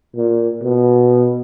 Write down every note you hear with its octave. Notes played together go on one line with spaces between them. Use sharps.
A#2
B2